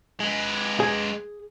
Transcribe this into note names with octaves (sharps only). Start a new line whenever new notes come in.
G#3 B4
G#4